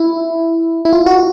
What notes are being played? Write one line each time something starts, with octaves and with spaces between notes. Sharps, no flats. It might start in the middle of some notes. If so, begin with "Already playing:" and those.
Already playing: E4
E4
F4
F#4